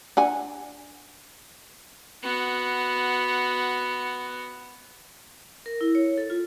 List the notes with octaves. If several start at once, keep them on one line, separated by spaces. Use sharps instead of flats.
D4 F#5 G#5
B3 F#4
A#4
E4
C#5
A4
F4